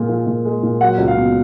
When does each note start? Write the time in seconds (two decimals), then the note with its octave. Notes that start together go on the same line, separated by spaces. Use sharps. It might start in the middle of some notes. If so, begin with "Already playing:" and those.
Already playing: A#2 G#3
0.08 F3
0.26 A#2
0.45 G#3
0.63 A#2
0.81 F#3 F#5
0.98 C#2
1.08 F5
1.17 B2